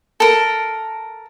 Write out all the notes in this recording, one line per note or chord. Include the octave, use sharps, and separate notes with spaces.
A4 A#4